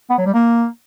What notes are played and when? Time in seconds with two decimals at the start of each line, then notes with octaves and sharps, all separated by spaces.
0.10 B3
0.18 F#3
0.26 G3
0.34 A#3